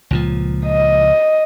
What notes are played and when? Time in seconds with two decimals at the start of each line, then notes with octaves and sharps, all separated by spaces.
0.11 C#2 A#2 F3
0.67 D#5